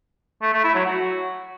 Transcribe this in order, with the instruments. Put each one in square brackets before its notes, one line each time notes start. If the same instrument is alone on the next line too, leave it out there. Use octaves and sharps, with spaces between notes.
[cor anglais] A3
A3
E4
F#3
F#4